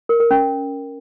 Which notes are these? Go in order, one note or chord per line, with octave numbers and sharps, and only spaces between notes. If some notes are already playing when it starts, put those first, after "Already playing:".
A#4
A#4
C#4